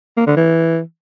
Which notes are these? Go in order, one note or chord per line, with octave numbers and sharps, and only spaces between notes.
A#3
D3
E3